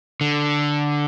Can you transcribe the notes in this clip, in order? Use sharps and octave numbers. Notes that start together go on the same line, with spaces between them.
D3